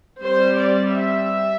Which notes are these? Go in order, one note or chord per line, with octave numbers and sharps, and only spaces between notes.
G3 C4 C5
D5
E5